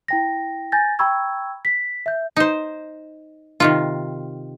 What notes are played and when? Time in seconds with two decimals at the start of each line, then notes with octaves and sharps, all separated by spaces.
0.08 E4 G5 A#6
0.72 G#5 G6 A6 A#6
0.99 G5 A#5 B5 C#6 E6 G#6
1.65 B6
2.06 E5 G6
2.36 D#4 C5
3.60 C3 D#3 F4